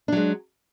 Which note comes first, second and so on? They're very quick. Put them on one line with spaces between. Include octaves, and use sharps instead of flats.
D4 F#3 G#3